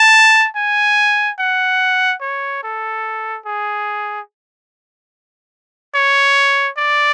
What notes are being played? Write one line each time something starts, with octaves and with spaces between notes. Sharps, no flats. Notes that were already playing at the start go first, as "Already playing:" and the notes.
Already playing: A5
G#5
F#5
C#5
A4
G#4
C#5
D5